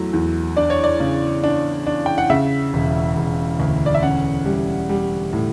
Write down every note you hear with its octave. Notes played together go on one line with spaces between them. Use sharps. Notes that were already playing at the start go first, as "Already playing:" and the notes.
Already playing: E2 F#3 A3
E2
D4 D5
C#5
D5
C#3
D4
D4
G5
F#5
C#3 E5
E1
E1
D2
D5
E5
C#4 F#5
G3
G3
A2